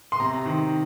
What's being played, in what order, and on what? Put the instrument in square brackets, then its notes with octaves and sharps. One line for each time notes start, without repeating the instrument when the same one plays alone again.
[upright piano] C6
C3 A#5
D#3